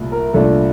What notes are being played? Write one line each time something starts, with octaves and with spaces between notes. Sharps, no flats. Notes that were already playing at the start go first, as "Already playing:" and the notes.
Already playing: C2 A#2 A3
A#4
C2 A#2 A3 D4 A4